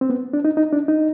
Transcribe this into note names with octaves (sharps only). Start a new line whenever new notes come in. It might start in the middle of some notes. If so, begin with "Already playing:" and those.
C4
B3
D4
D#4
D#4
D4
D#4